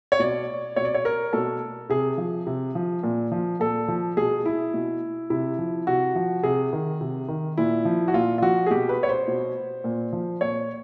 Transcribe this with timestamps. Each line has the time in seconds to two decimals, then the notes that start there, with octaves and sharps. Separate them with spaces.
0.12 C#5
0.19 B2 D5
0.76 B2 C#5
0.85 D5
0.94 C#5
1.05 A#4
1.33 B2 A4
1.89 C3 G#4
2.18 F3
2.47 C3
2.75 F3
3.03 A#2
3.32 F3
3.60 A#2 A4
3.88 F3
4.17 B2 G#4
4.46 E4
4.74 B2
5.30 C3 E4
5.59 F3
5.87 C3 F#4
6.16 F3
6.43 C3 G#4
6.73 D#3
7.01 C3
7.28 D#3
7.57 A#2 E4
7.85 F3
8.08 F#4
8.14 A#2 F4
8.38 F4
8.42 F3 F#4
8.66 G#4
8.71 B2 G4
8.89 B4
9.03 C#5
9.09 C5
9.28 B2
9.84 A#2
10.13 F3
10.41 A#2 C#5